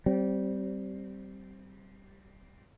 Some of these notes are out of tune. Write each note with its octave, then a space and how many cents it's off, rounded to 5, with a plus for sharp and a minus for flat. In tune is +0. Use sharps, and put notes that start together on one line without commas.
G3 -15 C4 +0